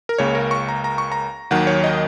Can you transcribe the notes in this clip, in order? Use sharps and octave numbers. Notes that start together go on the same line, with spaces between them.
A#4
C#2 C#3 A#3 C#5
A#4
C#6
A#5
A#5
C#6
A#5
D#2 D#3 F#3 F#5
C#5
D#5